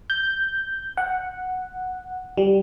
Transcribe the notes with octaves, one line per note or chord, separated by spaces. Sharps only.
G6
F#5
G3